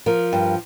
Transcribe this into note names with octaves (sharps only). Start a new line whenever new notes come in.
F3 A#4
G2